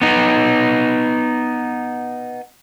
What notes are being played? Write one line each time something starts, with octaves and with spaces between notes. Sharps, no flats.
B3 D#4